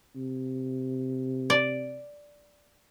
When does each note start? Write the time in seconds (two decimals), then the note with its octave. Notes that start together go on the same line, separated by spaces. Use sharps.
0.16 C3
1.50 D5